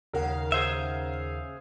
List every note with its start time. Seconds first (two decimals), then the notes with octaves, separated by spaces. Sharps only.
0.13 D#2 C#3 A#4 F5 F#5
0.52 G#4 C5 E5